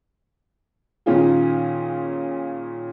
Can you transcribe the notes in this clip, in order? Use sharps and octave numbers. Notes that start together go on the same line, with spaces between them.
A#2 D#3 C#4 F4 G#4